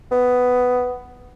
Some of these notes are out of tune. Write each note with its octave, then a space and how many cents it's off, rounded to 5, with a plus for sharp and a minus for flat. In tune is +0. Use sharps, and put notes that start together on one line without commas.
B3 +10